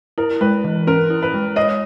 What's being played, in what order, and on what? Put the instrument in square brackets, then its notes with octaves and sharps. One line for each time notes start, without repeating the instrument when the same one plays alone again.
[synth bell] E4 [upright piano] A#4
[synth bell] G#3 [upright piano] B4
[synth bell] E3
[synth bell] C#4 [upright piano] A#4
[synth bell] E4
[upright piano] B4
[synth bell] G#3
[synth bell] C#5 [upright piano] D#5